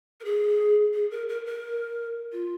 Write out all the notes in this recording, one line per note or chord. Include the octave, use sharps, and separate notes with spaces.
A#4
G#4
G#4
A#4
A#4
A#4
F4